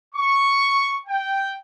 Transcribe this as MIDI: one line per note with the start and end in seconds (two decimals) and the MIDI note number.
0.15 0.97 85
1.06 1.54 79